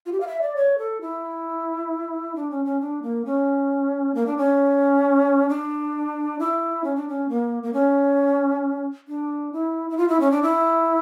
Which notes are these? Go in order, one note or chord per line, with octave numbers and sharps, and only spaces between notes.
F4
G4
F5
E5
D5
C#5
A4
E4
D4
C#4
C#4
D4
A#3
C#4
A#3
D4
C#4
D4
E4
C#4
D4
C#4
A#3
A#3
C#4
D4
E4
E4
F4
E4
C#4
D4
E4